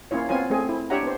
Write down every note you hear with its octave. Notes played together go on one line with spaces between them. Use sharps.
A#3 C#4 E4 F4 C#5
B3 C4 F4 C#5 G#5
A3 C4 G#4 G#5
E4
D4 G4 C#5 E5 F#5 A#5
B3 C5